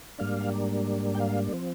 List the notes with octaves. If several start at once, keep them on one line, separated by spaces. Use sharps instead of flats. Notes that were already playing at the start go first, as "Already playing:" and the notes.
G#2 G3 A#3 D4 F5
G5
F5
F3 C4